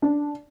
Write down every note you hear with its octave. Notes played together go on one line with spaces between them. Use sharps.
D4